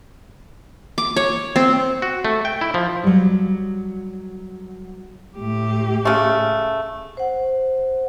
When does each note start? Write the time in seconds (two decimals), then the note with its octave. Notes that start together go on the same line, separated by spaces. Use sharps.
0.98 D6
1.16 C#5
1.56 C4
2.02 F#4
2.25 A3
2.45 G5
2.61 E4
2.74 F3
3.04 F#3 G3
5.37 A2 G4
6.05 C#3 A3
7.17 C5 F#5